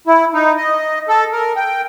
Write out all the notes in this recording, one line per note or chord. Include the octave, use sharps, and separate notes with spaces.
E4
D#4
D#5
A4
A#4
G5